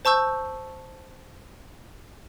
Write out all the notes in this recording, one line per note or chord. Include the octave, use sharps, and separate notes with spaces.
C5 A5 C#6 E6 G6